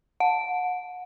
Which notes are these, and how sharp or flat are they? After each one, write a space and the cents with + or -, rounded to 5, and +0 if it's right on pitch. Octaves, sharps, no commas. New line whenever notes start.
F#5 -30